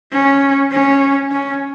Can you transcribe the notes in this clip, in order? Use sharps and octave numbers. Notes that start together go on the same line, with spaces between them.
C#4
C#4
C#4